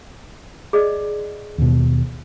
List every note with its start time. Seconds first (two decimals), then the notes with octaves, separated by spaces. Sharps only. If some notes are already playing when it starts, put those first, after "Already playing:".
0.73 G#4 D5 D#5
1.58 D#2 B2